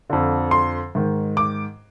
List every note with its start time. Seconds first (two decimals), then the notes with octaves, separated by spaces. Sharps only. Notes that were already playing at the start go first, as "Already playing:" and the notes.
0.10 F2 D3
0.51 C6
0.95 G#2 D#3
1.37 D6